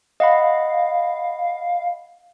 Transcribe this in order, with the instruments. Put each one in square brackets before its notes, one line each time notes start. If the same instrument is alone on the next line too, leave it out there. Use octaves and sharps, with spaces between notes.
[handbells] D#5 F#5 B5 [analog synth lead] F5